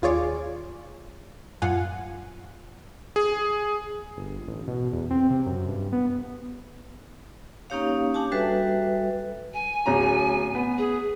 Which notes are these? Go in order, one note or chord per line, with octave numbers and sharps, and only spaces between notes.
D#2 F4 G#4 C#5 D5
A#1 F#2 F4 F#5 G#5
G#4
G1
A1
B2
E2
C4
C3
F#2
G2
B3
A#3 C#4 D#4 G4 C#5 F5
D4 G4 G#5 A5
G3 F#4 A4 B4 E5
G#5
D1 C#4 A#5
B3
G#4